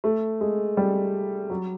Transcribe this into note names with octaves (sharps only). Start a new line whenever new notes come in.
A3
G#3
G3
F#3